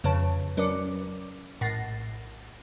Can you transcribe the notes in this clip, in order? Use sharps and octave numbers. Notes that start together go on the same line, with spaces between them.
F2 C#3 F3 B4 C#5 A5
F#3 C#4 A#4 B4 D5 D6
A#1 A2 F#5 A6 A#6 C7